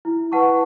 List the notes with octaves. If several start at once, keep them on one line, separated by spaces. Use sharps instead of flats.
E4
B4 F#5 A5 C#6